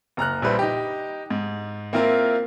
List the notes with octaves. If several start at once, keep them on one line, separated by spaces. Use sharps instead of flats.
F#1 A#5 F6 F#6
A#1 G3 E4 B4 C5
D#4 G4
G#2
A#3 C4 E4 F4 A#4 F5